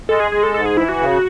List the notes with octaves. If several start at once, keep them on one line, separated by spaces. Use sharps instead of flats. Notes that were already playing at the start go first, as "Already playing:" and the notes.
G#3 A4
G#4
G#3 G#4
A4
G#2 A4
G#4
E3 E4
F#4
C#3